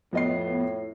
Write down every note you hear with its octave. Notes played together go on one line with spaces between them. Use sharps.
F2 A2 B3 D#5 C7